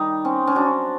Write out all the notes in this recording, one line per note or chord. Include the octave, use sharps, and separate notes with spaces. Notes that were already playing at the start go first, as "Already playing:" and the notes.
Already playing: D#3 G3 D#4
C4 C#4
C#4
F#3 D4